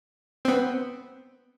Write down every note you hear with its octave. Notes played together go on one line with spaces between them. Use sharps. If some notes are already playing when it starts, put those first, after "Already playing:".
B3 C4